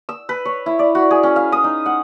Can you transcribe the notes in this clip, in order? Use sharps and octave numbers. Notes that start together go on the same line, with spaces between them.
E6
B4
C#5
E4
D5
F#4
G#4
C#4
F5
D#6
D#4
F#5